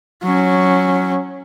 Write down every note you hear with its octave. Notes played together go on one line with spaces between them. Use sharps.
F#3 C#4